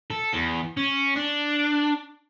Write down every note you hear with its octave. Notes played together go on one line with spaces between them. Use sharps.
A4
E2
C#4
D4